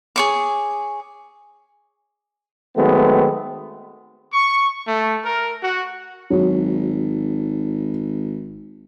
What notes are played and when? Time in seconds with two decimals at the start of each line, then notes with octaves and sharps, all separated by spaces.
0.16 G#4 C#5 D6
2.77 D#3 F#3 G#3 A3 B3 C4
4.33 C#6
4.87 A3
5.25 A#4
5.63 F#4
6.30 G#1 F#3